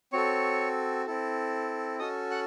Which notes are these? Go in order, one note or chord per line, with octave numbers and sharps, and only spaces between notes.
C4 F#4 A4 C#5 C#6
C4 E4 A4
C#4 F#4 A4 D#5 D#6
F#5 F#6